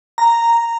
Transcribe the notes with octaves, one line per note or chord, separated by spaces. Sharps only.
A#5